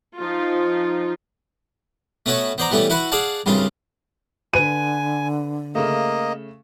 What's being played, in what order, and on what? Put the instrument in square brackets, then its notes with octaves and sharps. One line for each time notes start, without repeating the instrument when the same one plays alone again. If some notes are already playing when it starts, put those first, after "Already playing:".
[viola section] F3 D#4 F4
[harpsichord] A3 B3 C#4 F#4 C#5
B3 C5 D5 A#5
E3 G3 A3 B3 C#4
E4 F#4 B4 F#5 B5
G#4 D5 F5 F#5 A5
C2 G2 C#3 F4
[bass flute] D3 [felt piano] B4 [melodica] G#5 [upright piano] D#7
[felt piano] C#3 A3 [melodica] A#3 D#5